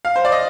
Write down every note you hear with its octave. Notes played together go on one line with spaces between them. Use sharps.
F5
C5
D5
D#5